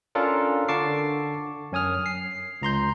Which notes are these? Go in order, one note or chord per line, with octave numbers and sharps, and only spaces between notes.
C#4 D4 F4 A4 A#4
D3 A5 C#6 D6 C7
F#2 C#4 G#5 D#6 F6
C7
C#2 A#5 C6 G6